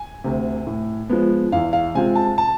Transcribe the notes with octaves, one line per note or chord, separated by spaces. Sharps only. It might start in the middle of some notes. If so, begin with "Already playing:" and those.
Already playing: G#5
D2 C3
A2
F3 G#3 B3
E2 F5
F5
C3 G#3 C4 F4 G#5
A5
A5